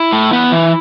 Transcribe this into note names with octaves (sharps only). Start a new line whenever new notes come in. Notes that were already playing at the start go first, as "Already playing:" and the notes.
Already playing: E4
A2
B3
E3